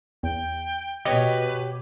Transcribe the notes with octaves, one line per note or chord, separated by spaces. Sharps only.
E2 G5
B2 G4 B4 C#5 D#5